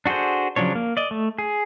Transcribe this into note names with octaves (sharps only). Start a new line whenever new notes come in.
D4 F#4 G#4 A4 C5
C#3 F3 F#3 D4 C#5
A#3
D5 D#5
A3
G#4